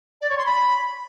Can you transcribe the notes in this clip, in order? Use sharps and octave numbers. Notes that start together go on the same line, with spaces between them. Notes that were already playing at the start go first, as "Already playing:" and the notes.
D5
C#5
C6
B5